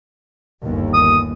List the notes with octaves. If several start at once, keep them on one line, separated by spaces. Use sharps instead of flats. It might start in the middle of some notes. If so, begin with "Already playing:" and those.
G1 D#2
D#6